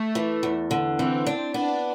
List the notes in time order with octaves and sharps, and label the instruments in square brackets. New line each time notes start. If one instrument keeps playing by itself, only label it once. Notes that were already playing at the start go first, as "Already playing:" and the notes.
Already playing: [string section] A3
[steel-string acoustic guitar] E3
E2
D3
[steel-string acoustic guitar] E3 [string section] C4
[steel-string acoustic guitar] D4
[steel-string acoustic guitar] B3 [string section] D4